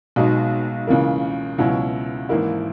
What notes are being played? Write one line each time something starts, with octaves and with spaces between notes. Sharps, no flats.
B1 B2 G#3 D#4
C#2 C#3 E3 A#3
C#2 B2 F#3 C#4 E4
G#1 G#2 E3 A#3 E4